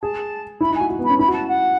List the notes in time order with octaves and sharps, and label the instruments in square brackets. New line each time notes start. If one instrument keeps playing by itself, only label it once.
[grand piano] G#4 [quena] A5
[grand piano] E4 [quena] B5
[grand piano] D#4
[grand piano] F#4 [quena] G#5
[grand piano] F#4
B3
[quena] B5
[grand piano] C#4
[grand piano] E4 [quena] B5
[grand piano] F#4
[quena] A5
F#5